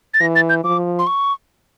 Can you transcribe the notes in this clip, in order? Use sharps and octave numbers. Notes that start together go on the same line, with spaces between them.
A6
E3 A#6
A6
G6
F3 D6
C6
C#6